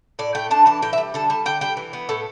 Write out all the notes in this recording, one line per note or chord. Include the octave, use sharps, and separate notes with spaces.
A2 D5
A3 G5
D4 A5
E3 A5
A2 G5
E5
G3
D3 A5
G3 A5
D3 G5
G3 G5
E3
B3
A2 A4